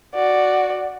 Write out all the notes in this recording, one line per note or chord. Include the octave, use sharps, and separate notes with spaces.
F#4 D5